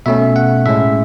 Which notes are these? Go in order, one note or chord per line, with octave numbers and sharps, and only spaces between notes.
B2 A3 C#4 E5
F#5
A2 G#3 C#4 E5